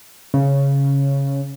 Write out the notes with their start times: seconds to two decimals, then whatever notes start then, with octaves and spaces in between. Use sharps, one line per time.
0.34 C#3